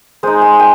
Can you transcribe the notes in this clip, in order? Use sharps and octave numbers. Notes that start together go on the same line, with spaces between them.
G#3 D#4 C5
G#5
G5